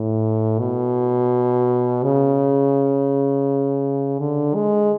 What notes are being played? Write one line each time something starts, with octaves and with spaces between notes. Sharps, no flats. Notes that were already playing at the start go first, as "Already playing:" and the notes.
Already playing: A2
B2
C#3
D3
G#3